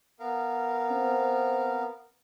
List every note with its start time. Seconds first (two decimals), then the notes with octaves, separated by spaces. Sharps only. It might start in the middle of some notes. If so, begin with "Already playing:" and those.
0.20 B3 A#4 F5
0.91 C4